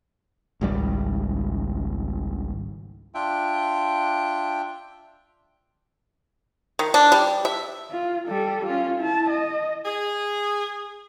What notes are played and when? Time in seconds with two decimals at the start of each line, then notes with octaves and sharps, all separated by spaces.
0.61 G#1 C#2 G3
3.15 D4 F4 E5 G5
6.79 D#3
6.94 D4
7.12 G3
7.45 E5
7.91 F4
8.27 G3 A4
8.66 C#4 F4
8.99 E4 A5
9.30 D#5
9.86 G#4